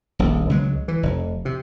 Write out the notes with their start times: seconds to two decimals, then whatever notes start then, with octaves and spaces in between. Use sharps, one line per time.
0.19 D#1 A#1
0.50 C#2 F#3 G#3
0.88 E3
1.03 F1
1.45 C3